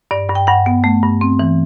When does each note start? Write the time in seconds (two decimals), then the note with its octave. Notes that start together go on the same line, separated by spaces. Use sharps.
0.11 G2 D5
0.29 G2
0.35 G5
0.47 G2 F#5
0.66 B3
0.84 A3
1.03 G2
1.21 C4
1.39 E3